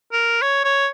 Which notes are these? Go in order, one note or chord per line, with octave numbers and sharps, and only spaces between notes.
A#4
C#5
C#5